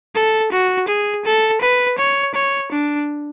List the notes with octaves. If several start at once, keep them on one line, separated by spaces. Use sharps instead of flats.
A4
F#4
G#4
A4
B4
C#5
C#5
D4